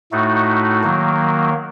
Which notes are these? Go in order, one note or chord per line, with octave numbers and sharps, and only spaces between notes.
A2 A3 D#4 F#4
D#3 F#3 A#3